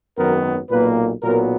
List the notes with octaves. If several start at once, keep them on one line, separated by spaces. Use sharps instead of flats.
G#1 F#2 D#3 F#3 B3 A#4
B1 A#2 A#3 B4
B1 A#2 F#3 B3 A#4